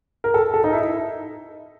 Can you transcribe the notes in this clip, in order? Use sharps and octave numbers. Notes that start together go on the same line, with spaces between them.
A#4
A4
A4
D#4
E4